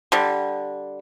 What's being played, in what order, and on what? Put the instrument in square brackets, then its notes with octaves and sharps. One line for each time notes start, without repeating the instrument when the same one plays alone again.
[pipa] D3 G3